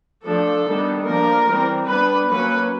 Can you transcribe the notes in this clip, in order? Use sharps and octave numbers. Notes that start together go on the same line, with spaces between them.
F3 A3 D4 A4
D#3 G3 B3 D4
F3 A#3 D4 A#4
E3 G3 C4
G3 B3 D4 B4
F#3 A#3 C#4 B4